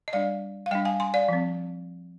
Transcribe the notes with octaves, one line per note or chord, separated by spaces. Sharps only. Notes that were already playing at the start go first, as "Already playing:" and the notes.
D#5
G3 D4 D5 F5
F5
G3 D4 D#5 G5
F5 G#5
G#5 C6
D5 F5
F3 C4